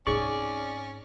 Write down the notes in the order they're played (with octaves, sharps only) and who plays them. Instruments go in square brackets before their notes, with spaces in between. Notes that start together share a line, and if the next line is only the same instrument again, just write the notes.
[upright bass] G#2 C4 [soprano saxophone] C#4 [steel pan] D#4 G#4 C#6 [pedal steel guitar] D5